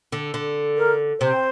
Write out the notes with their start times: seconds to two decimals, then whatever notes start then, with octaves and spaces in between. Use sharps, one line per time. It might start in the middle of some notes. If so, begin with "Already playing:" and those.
0.12 D3
0.34 D3
0.77 A#4
1.20 C3 C5